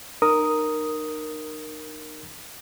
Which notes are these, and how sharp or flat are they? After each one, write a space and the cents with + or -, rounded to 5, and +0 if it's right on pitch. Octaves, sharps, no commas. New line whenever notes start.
D#4 -30 A#4 +0 D#6 +0